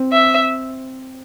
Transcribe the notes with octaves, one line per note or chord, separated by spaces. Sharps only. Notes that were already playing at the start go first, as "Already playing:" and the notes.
Already playing: C4
E5